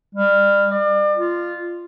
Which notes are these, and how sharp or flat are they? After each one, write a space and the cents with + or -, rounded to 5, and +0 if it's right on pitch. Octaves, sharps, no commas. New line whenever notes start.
G3 +30
D5 +35
F4 -5